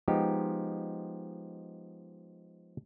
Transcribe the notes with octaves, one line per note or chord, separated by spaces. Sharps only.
F3 G#3 B3 D#4 G4